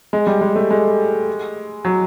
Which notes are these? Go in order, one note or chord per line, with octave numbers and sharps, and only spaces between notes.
G#3
G3
G#3
A3
G#3
F#3